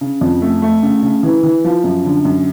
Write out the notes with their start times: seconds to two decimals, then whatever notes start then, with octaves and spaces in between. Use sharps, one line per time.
0.01 C#3
0.21 F2
0.42 A3
0.62 A3
0.83 C#3
1.03 C#3
1.23 E3
1.43 E3
1.64 F3
1.84 F#2
2.05 D3
2.25 F#2